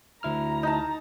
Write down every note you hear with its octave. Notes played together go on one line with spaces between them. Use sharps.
D2 E4 A#5 F6
D#4 A5